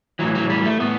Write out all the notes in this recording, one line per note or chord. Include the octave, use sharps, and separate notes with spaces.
A2 E3 F#3
F#3
G3
A3
A2 B3